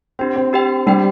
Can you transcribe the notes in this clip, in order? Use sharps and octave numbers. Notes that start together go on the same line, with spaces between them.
C4 D4 G4 C5 G5
C4
D4 G4 C5 G5
G3 D4 G4 C5 G5